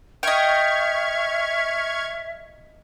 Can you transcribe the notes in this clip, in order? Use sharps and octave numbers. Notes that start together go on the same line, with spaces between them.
D#5 E5 G5 C#6 F6 G#6